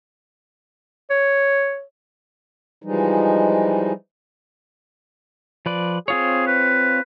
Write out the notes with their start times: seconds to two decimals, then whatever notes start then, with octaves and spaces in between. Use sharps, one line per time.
1.10 C#5
2.82 E3 F3 G3 G#3 D#4
5.66 F3 B4 D5
6.08 C4 F4 G#4 C#5
6.47 B4